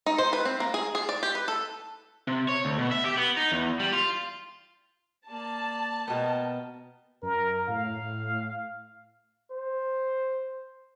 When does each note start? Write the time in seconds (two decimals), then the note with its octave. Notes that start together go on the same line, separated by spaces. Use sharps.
0.06 D#4
0.18 C5
0.33 B4
0.45 C4
0.60 A#3
0.74 G#4
0.95 G#4
1.09 D5
1.23 G4
1.35 B4
1.48 A4
2.27 C3
2.49 C#5
2.65 D2
2.78 B2
2.91 E5
3.06 G4
3.17 B3
3.37 D#4
3.52 E2
3.80 G3
3.93 F4
5.29 A#3 D5 A5
6.08 B2 B3 A#4 G5
7.23 F#2 A#4
7.68 A2 F5
9.51 C5